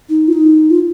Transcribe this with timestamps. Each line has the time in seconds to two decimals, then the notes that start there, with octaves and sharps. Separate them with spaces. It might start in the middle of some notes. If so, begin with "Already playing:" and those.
0.09 D#4
0.28 F4
0.33 D#4
0.70 F4